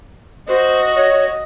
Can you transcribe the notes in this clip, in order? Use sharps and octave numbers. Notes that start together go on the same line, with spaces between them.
F#4 C5 D#5
C#5